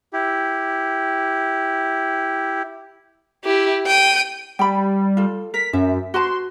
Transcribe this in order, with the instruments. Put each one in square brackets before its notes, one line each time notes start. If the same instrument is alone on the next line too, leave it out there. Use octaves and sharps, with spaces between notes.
[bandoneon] E4 G4
[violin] E4 G4
G5 D#7
[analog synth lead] G3 [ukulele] G5 B5
[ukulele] F4 A4
[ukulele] A#4 [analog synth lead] B6
[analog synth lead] F#2 [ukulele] E5
[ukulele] F#4 B4 A5 [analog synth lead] C6